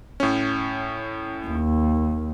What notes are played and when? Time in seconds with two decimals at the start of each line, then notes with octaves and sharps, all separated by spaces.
0.20 A2 C#4
1.47 D#2